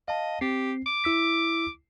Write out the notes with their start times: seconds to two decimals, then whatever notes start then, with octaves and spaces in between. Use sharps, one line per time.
0.08 D#5 F5 A5
0.41 C4 G4 C7
0.86 D6
1.04 E4 E6 B6